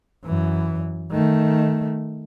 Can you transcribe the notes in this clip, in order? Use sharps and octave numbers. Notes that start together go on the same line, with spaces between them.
F#2 E3
D#3 A3